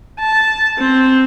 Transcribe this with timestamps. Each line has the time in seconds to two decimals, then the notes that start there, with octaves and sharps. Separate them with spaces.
0.20 A5
0.79 C4